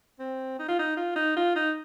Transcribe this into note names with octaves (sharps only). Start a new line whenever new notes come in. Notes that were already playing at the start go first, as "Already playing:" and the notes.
C4
D#4
F4
D#4
F4
D#4
F4
D#4